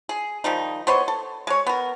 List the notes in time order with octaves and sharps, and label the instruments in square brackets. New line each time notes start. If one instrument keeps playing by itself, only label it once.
[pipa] G#4
D#3 F3 G3 D#4
B3 C5 C#5 D#5
A4
G#3 C#5
B3 A#4